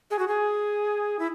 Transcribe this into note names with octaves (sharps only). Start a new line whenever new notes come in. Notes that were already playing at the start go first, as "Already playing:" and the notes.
G#4
F#4
G#4
E4